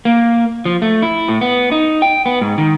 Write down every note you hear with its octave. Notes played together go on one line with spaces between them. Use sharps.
A#3
F3
A3
E4
A2
B3
D#4
G5
B3
G#2
D#3